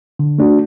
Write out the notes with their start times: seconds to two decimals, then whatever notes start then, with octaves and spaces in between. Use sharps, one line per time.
0.19 D3
0.39 A3 D4 F#4